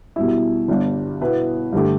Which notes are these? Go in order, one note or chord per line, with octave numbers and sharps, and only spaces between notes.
B2 G3 E4
G1 G2 G3 D4
B2 B3 E4 B4
G2 D3 A3 G4